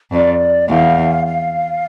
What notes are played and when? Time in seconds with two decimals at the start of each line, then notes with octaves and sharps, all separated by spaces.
0.12 F2 D5
0.68 E2 F5
1.24 F5